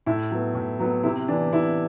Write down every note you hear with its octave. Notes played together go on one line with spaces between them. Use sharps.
A2 E4
F#3 B3
A2
F#3 B3
C3 E4
E3 B3 D4
C3 E4